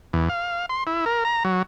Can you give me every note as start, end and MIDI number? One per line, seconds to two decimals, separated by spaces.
0.13 0.29 40
0.29 0.66 77
0.69 0.84 84
0.87 1.05 64
1.06 1.24 70
1.25 1.43 82
1.44 1.62 54